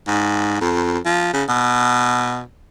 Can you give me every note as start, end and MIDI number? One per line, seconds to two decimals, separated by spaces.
0.07 0.60 44
0.61 0.99 41
1.05 1.29 53
1.34 1.44 49
1.49 2.42 47